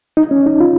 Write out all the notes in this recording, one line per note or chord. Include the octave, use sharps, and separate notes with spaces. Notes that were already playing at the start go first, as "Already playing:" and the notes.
D#4
C#4
D#4
F4